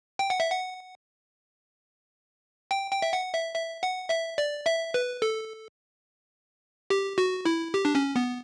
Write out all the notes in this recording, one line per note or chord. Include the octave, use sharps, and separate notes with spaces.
G5
F#5
E5
F#5
G5
G5
E5
F#5
E5
E5
F#5
E5
D5
E5
B4
A4
G4
F#4
E4
G4
D4
C#4
B3